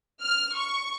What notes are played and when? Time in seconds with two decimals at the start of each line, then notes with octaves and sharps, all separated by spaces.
0.21 F6
0.56 C#6